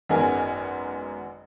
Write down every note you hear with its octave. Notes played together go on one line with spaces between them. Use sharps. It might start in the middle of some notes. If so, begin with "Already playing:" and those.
G#1 F#2 G#3 B3 A#4 G#5